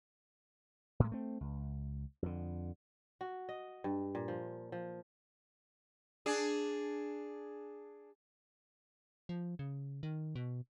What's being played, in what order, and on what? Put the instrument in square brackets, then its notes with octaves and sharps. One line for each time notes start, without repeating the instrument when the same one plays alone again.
[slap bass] A2 G#3
A3 C4
C#2
F2 D3
[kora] F#4
D#5
G2
A#2
F3
F3
[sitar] D4 G#4
[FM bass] F3
C#3
D#3
B2